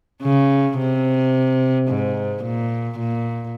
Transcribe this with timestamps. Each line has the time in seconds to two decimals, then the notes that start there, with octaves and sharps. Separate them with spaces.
0.23 C#3
0.79 C3
1.89 G#2
2.44 A#2
2.99 A#2